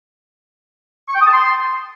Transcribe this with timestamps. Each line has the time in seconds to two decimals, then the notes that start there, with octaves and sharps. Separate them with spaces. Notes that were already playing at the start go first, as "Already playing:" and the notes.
1.08 C#6
1.14 G5
1.20 D#6
1.26 A5
1.32 C6